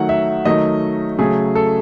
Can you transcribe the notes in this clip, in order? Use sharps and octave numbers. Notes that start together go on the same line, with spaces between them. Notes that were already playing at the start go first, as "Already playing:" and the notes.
Already playing: D#3 F#3 A3 F#5
E5
D#3 F#3 A3 D#5
C#3 F#3 A3 G#4
A4